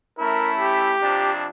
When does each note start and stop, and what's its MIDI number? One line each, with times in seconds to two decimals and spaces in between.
0.19 0.92 57
0.19 0.92 61
0.19 0.92 64
0.19 0.52 70
0.58 1.31 67
1.02 1.46 41
1.02 1.46 48
1.02 1.46 62